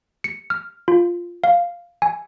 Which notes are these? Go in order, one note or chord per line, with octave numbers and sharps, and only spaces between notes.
C#7
F6
F4
F5
G#5